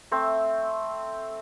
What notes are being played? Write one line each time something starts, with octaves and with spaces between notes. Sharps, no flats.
A3 C4